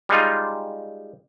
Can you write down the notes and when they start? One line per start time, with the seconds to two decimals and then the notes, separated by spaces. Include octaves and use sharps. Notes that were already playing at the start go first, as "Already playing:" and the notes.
0.09 G3 G#3 D#4 F4